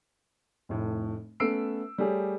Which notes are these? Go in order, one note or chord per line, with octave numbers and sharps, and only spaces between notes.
F1 A2
A3 B3 C#4 E6 C7 D7
G3 A3 G4 G#4 C#5